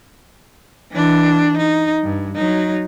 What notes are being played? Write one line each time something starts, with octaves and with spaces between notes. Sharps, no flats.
E3 D4
D#4
G2
F#3 D#4